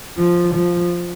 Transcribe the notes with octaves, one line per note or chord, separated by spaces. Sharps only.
F3
F3